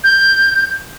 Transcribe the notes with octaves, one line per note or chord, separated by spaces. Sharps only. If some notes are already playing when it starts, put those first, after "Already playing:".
G6